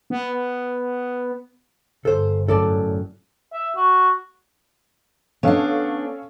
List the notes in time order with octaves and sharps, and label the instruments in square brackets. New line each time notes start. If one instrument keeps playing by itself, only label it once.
[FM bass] B3
[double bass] G1 [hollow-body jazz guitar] A4 C5
[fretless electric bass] F#2 A2 [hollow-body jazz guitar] A4 D5 A5
[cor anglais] E5
F#4
[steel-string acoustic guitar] B3 D4 [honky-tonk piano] C#4 A4 F5